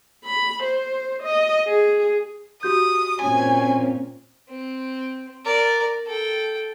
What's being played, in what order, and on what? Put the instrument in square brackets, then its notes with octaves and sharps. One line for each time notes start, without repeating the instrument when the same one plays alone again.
[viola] B5
C5
D#5
G#4
[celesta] F#4 G4 G6 [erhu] D#6
[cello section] A#2 C4 C#4 [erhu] G#5
[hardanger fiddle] C4
A#4 D5
A4 G5